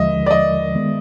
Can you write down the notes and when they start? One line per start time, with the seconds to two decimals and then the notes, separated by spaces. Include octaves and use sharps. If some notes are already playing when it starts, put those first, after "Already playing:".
Already playing: D#2 D3 F3 G#3 D#5 E5
0.26 D5
0.31 D#5
0.75 D#3 G#3 B3